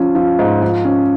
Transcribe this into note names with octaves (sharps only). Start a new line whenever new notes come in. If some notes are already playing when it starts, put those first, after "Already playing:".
Already playing: F3 C#4
F3
G#2
F3
C#4